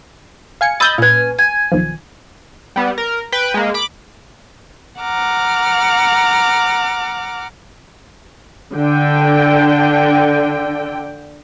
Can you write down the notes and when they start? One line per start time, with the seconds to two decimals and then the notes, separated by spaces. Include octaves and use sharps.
0.61 F5 G#5 C#7
0.80 D#5 B5 D#6 E6 G6 A6
0.98 A#2 C#4 B4 G#5
1.39 G#5
1.72 B1 D#3 F3
2.76 G3 B3
2.98 A#4
3.32 B4 G5
3.54 G#3 A#3
3.74 B5 D6
5.00 F#5 A#5 D6 F6
8.74 D3 G5